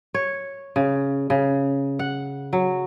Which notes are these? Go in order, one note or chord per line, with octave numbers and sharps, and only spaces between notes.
C#5
C#3
C#3
F#5
F#3